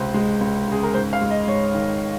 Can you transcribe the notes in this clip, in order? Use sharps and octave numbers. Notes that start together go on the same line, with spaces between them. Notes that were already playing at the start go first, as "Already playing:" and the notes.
Already playing: C#2 C3 C5
G#3
C#2
C#3 G#4
A#4
G#2 C5
F5
G#3
D#5
G#2 C#5
D#3